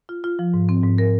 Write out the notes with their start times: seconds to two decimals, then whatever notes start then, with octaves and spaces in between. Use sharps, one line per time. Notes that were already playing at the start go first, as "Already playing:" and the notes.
0.09 F4
0.24 F4
0.39 F3
0.54 G#2
0.69 C4
0.84 G#2
0.98 A#4